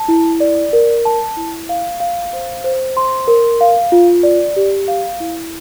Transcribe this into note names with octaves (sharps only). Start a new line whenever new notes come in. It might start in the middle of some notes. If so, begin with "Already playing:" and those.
Already playing: A5
E4
D5
A#4
A5
E4
F5
F5
C5
C5
C6
A#4
F5
F4
D5
G4
F5
E4